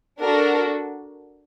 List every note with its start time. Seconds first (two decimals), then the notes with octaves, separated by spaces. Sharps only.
0.20 D4 F#4 A4 A#4